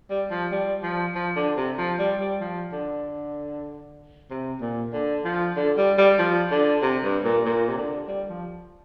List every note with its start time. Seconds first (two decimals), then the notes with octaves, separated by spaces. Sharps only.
0.10 G3
0.30 F3
0.52 G3
0.83 F3
1.15 F3
1.36 D3
1.57 C3
1.78 F3
1.99 G3
2.20 G3
2.41 F3
2.72 D3
4.31 C3
4.61 A#2
4.93 D3
5.24 F3
5.56 D3
5.77 G3
5.98 G3
6.19 F3
6.51 D3
6.82 C3
7.04 G2
7.24 A#2
7.46 A#2
7.69 C3
7.77 D3
8.08 G3
8.30 F3